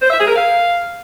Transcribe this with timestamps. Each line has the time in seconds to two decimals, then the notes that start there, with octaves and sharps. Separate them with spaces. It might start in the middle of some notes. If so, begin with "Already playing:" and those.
0.02 C5
0.10 E5
0.19 G#4
0.27 A#4
0.36 F5